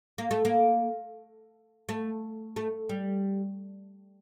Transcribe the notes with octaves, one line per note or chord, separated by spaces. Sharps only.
A#3
A3
A#3
A3
A3
G3